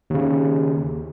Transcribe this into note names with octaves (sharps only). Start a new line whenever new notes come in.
D#2 C#3